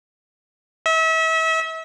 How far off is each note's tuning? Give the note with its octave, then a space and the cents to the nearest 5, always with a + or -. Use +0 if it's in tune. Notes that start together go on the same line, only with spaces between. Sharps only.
E5 -35